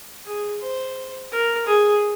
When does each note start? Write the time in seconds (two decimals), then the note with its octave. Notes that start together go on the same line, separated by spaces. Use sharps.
0.25 G#4
0.61 C5
1.31 A#4
1.67 G#4